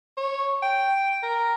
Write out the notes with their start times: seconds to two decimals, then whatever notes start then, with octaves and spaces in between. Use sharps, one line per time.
0.18 C#5
0.63 G5
1.23 A#4